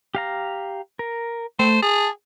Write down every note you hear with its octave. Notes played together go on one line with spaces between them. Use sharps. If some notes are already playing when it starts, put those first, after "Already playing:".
G4 F5 A#5
A#4
A3 C5
G#4 A5